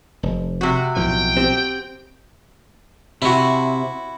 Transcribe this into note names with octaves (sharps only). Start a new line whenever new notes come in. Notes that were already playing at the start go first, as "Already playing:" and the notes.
F1
C3 F#4
B1 A2 F3 G5
C4 G4
C3 E4 F#4